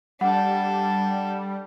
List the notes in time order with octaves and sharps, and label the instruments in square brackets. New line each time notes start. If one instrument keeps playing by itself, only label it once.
[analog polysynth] G3 [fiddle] D4 A4 [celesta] F#5